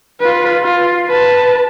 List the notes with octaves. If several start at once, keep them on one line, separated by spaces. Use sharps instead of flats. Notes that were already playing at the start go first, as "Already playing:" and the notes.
F4 B4
F4
B4 A5